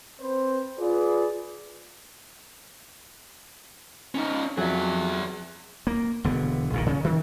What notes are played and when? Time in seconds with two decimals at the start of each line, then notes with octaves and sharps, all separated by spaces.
0.21 C4 B4 C5
0.79 F4 G#4 B4 D5
4.15 C#4 D#4
4.58 F2 F#3 G#4 E5
5.87 A#3
6.24 E1 D3 B3
6.73 A#1 A#2 D#3
6.86 C#3 C#4
7.04 D#3 E3